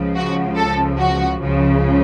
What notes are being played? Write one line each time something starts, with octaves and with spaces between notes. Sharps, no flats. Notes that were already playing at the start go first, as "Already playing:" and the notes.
Already playing: C#2 C#3 F3
F#4
A4
F#4
C#2 C#3 F3